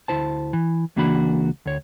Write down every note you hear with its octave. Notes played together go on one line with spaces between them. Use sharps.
D2 E4 C5 A5
E3
C#2 E3 A#3 D4 F#4 B5
D2 C#5